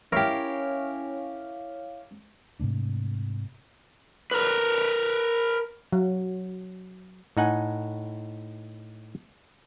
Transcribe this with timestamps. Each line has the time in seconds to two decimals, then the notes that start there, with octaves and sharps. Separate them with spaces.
0.12 C#4 E4 G4 A#4 C#5 F5
2.60 G#2 C3 A3 D4
4.31 A#4 B4
5.93 F#3
7.37 A2 D#4 F#5 G#5